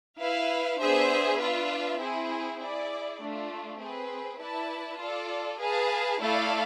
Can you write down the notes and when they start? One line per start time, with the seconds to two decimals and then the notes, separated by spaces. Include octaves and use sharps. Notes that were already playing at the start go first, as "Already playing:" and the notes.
0.20 E4 B4 F5
0.80 B3 D4 G#4 C5 E5
1.39 D4 F4 B4 E5
2.00 C4 E4 G#4
2.61 E4 G#4 D5
3.20 A3 D4 F4
3.81 C4 G#4 B4
4.40 E4 B4 D5 A5
5.00 F4 A4 D5
5.60 G#4 B4 F5 A5
6.20 A3 E4 A4 D5 F5